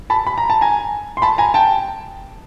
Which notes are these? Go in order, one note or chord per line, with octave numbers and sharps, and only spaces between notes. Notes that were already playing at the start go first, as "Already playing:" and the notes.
A5 B5
B5
A#5
A5
G#5 A#5
C6
A5 B5
G#5 A#5
G5 A5